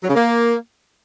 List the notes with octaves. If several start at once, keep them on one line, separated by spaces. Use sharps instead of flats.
F#3
C#3
A#3